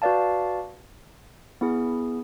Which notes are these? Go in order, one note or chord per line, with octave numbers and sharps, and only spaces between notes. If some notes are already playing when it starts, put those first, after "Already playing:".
F#4 B4 D5 F5 A5
B3 E4 G#4